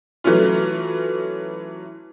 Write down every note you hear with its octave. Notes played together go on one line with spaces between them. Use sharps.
E3 F#3 A3 C#4 F4